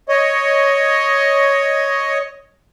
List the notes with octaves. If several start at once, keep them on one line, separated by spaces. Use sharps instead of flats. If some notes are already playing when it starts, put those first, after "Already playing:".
C#5 D#5